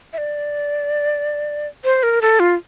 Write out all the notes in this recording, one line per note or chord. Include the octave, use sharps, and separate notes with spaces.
E5
D5
C5
A#4
A4
F4